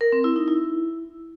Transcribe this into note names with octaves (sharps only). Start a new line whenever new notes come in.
A#4
C4
E4
D#4
E4